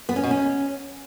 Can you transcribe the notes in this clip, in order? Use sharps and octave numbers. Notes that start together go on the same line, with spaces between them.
B3
C#4
B2
C#4